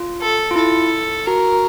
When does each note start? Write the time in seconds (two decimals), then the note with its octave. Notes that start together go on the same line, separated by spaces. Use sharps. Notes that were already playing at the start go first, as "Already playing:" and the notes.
Already playing: F4
0.22 A4
0.51 F4
0.56 E4 A4
1.26 F#4 A#4